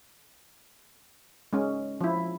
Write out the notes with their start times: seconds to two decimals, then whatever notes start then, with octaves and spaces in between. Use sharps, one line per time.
1.53 G#3 C#4
2.01 F3 E4